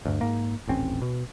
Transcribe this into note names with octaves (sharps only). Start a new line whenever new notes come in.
D2 G2
G#2 A#3
D#1 A1 C4 C#4
B2